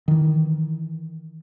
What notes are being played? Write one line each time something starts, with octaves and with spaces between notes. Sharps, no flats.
D#3 E3